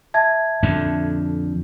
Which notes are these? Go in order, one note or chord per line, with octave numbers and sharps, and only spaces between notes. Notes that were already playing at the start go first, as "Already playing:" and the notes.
E5 A5 G#6
F2 D3